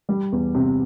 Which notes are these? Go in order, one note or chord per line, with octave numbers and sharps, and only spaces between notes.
G3
E2
C3